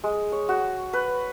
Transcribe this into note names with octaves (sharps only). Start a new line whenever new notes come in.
G#3
C#5
F#4
B4